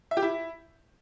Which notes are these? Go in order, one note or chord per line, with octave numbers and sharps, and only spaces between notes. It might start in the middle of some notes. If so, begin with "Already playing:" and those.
E5
G4
E4